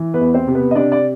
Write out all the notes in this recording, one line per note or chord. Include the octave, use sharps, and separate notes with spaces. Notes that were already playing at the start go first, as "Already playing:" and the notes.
Already playing: E3
B3 B4
E2
C4 C5
C3
B3 B4
D#5
C3 D4 D5
D5